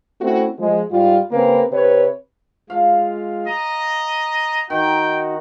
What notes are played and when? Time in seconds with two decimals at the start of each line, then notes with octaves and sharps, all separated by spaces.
0.21 A3 C4 C#4 E4 F#4
0.59 F3 G#3
0.92 G#2 G3 F4
1.32 C#3 A#3 C4 B4
1.72 C3 B4 C#5
2.70 G#3 F4 F5
3.47 D#5 A#5
4.70 D#3 D#4 F#4 G5